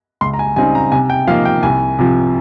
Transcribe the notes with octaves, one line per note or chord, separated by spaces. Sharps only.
C#2 C6
A#5
G#5
C#3 G3 C4 D#4 G#5
A#5
C3 G#5
G5
F3 A#3 D#4 F5
G5
C2 G#5
C3 F3